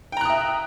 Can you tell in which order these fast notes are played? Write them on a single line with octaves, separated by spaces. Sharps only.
G5 A#5 F#6 D#6 E5